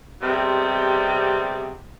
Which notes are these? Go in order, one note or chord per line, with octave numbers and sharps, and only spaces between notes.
C3 G3 G#3 B3 C4